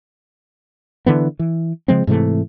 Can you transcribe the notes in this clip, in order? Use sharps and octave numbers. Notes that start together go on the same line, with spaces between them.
D3 E3 B3
E3
C#3 F3 G#3 C4
G#2 C3 E3 A3